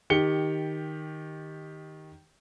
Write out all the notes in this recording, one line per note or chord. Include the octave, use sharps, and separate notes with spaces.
D#3 G4 C#7 G7